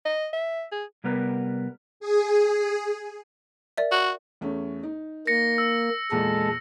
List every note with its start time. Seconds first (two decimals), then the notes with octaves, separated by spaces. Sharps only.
0.05 D#5
0.33 E5
0.72 G#4
1.04 C3 G3 B3 A#4 B4
2.00 G#4
3.78 A#4 D5 E5
3.92 F#4
4.41 E2 A3 C#4
4.83 D#4
5.27 A#3 A#6 C#7
5.58 E6
6.12 E2 A#2 G#3 A4